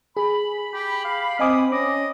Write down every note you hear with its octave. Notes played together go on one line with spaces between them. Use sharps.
G#4 B5
G4
F5
C4 D#5 G#5 D6 D#6
C#4 D#5 D6